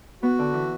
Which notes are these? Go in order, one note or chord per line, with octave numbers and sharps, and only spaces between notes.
B3 F#4
D3
E3